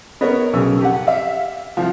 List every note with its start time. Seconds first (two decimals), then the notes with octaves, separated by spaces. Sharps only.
0.21 B3 A#4 C#5 D#5
0.53 B1 C#3 E6
0.81 F2 G4 F#5
1.07 E5 F5
1.77 C2 F3